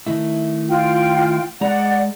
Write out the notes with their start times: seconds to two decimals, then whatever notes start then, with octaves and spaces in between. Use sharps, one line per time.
0.06 D#3 A3 E4
0.69 F4 G5
1.61 G#3 D5 F#5 A#5